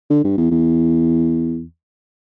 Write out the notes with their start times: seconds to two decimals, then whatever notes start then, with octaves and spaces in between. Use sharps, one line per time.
0.10 D3
0.24 G2
0.38 E2
0.51 E2